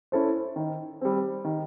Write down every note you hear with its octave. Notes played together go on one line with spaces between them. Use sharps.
C#4 E4 A4 C5
D#3
G3 C4
D#3